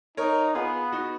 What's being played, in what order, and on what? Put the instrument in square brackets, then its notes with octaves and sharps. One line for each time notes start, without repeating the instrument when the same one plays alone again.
[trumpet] D#4 [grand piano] A#4 C#5
[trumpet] B3 [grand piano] F4 G#4
[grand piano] D#4 F#4